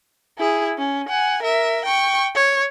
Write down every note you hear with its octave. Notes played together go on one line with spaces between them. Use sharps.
E4 G#4
C#4
F#5 G#5
A#4 E5
G5 C#6
C#5